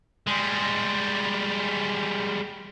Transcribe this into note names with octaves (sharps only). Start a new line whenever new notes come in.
G3 G#3